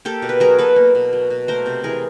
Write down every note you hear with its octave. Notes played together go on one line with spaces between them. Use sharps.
A#3 G4 A4
B2
B4
F#3 G#4 A#4
B2 A4 B4
A#3
B2
F#3
B2
A3 A#4 C5
C3
E3 G#4 A#4